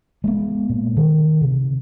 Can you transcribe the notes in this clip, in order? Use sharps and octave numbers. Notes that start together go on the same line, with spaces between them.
G#3 A#3 B3
A#2
D#3
C3